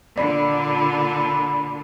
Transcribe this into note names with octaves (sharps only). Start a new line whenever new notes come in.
A#2 D3 D5 B5